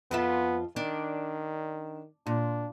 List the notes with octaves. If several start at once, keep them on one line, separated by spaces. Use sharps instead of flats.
F2 B3 F4 E5
D#3 D4
A#2 D4